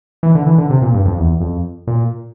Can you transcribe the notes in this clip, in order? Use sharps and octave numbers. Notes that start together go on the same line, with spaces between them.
E3
D3
E3
D3
C3
A#2
G2
F2
E2
F2
A#2